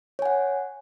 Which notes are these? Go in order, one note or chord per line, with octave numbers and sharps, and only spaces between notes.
C#5 F#5 G#5